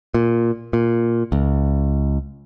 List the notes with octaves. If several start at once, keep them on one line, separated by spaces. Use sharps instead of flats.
A#2
A#2
C#2